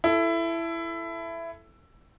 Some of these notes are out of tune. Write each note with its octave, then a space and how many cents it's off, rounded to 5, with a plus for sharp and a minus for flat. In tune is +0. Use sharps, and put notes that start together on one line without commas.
E4 +15 A4 +0